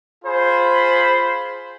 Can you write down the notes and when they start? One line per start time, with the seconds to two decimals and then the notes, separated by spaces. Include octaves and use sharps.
0.24 F4 G#4 C5 B5